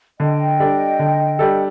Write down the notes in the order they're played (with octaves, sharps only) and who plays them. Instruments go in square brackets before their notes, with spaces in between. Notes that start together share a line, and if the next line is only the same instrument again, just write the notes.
[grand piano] D3 [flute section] D#5 G5
[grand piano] G3 D4 A4
D3
G3 D4 A4